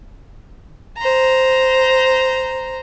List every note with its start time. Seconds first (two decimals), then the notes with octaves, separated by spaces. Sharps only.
0.98 C5 A#5